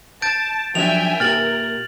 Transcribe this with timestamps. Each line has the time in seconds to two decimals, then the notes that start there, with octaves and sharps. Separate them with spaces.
0.22 A5 G6 A6 D7
0.75 F3 F#3 D4 E5 G5 G#5 F7
1.20 A#2 G4 A#4 E5 F6 A6 F#7